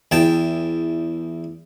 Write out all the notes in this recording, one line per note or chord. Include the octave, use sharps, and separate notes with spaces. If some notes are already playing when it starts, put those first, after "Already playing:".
E2 G5 A5